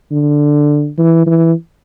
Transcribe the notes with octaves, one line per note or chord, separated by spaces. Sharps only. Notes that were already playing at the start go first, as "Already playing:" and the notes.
D3
E3
E3